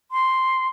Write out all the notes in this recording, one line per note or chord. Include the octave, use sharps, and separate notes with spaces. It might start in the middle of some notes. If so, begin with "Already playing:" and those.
C6